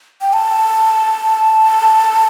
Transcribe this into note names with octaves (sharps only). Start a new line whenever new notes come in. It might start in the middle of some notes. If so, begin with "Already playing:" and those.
G5
A5